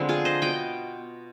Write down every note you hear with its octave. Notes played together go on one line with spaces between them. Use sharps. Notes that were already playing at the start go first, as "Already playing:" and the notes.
Already playing: D3 F3 G#3 B3 C4
F4 G#4
C5 D#5
B2 B3 D#5 G5